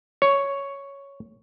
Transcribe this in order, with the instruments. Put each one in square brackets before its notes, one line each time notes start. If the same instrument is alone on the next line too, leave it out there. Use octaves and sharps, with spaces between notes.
[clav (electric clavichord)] C#5